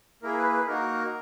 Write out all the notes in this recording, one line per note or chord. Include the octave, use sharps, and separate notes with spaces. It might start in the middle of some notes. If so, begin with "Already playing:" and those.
A#3 E4 G#4 A#4
B4
B4
A#3 D#4 F#4 A#4